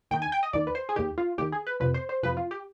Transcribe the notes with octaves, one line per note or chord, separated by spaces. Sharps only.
D#2 D#3 G5
G#5
G5
D#5
D#2 D#3 D5
B4
C5
G#4
D#2 D#3 G4
F4
D#2 D#3 G4
G#4
B4
F2 C3 F3 B4
C5
C5
F2 C3 F3 B4
F4
G4